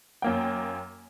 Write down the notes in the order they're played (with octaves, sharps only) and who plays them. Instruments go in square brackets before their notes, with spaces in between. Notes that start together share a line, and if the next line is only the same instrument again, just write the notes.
[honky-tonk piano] F#2 A#3 G5